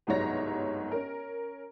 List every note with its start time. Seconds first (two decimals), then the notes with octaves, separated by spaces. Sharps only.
0.07 G1 C2 G#2 F#3 C#5 A#6
0.92 C#4 A#4